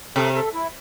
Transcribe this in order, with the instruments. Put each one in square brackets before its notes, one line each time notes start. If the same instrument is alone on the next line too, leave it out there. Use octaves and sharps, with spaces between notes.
[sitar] C3 [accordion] A4
[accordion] A4
E4